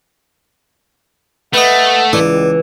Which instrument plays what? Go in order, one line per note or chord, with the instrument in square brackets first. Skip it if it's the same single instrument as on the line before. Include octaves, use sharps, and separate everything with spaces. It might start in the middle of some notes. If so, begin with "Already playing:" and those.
[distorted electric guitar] A3 [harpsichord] B4 D#5 [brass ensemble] F#5
[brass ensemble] C#2 [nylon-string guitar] E3 [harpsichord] D5